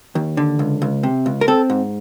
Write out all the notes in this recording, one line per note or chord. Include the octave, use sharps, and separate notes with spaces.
D#2
D3
C#2
C#2
C3
C#2
A#4
C4 A4
G#2